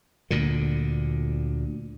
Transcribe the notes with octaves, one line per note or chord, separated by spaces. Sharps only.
D2 A#2 D3